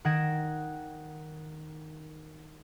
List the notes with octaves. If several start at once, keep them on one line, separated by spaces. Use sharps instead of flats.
D#3 F#5 G5 G#6 A#6 E7